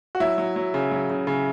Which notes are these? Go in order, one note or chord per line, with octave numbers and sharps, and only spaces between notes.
F#4
F#3 E4
F#3
F#3
C#3
F#3
C#3
C#3